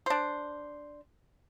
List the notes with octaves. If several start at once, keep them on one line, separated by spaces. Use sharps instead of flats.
D4 C5